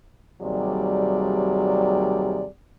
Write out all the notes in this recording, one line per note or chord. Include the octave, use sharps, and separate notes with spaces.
D#2 C3 F#3 G3 G#4 D5